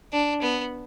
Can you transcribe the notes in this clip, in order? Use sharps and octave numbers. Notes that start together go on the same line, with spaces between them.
D4
B3